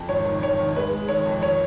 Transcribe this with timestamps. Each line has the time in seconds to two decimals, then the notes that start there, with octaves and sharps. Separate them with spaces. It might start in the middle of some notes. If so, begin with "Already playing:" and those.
Already playing: F2
0.09 G#1 C#5
0.26 D#3
0.42 G#1 C#5
0.59 D#3
0.76 G#3 B4
0.92 G#3
1.09 D#3 C#5
1.26 F2
1.42 D#3 C#5